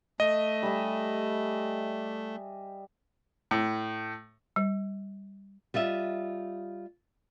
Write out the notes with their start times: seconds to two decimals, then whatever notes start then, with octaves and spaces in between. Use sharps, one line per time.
0.20 A3 D#5
0.62 G3 G#4 E5
3.51 A2
4.56 G3
5.74 G3 F4 D#5 E5